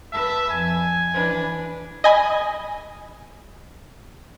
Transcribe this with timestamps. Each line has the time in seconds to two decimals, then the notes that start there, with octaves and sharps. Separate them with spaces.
0.13 B4 E5 A5
0.50 F2 G#5
1.13 E3 D4 B4
2.04 D#5 G#5 B5 D#6